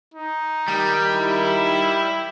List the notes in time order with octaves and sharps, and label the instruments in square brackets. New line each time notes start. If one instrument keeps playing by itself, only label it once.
[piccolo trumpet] D#4
[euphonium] D#3 [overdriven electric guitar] G3
[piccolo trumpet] E4